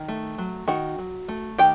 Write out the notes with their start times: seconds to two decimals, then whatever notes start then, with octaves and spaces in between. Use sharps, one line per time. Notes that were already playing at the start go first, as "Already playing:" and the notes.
Already playing: D#3
0.08 A3
0.38 F#3
0.68 D#3 F#4 F#5
0.98 F#3
1.28 A3
1.58 D#3 G4 G5